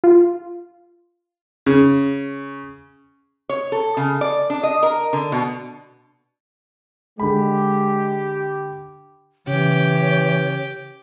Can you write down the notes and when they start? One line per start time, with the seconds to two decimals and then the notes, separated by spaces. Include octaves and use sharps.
0.04 F4
1.66 C#3
3.49 C#5
3.72 A4
3.97 C#3
4.21 D5
4.50 D4
4.63 D#5
4.83 A#4
5.13 D3
5.32 B2
7.19 D3 G#3 G4 B5
9.47 C#3 E3 G4 C#5